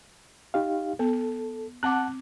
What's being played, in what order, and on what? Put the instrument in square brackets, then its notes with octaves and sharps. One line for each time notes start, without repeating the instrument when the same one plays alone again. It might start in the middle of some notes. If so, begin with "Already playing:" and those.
[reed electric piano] D#4 G4 F5
[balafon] B3 [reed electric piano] A4
[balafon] C4 D6 [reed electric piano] F#5 A5 F#6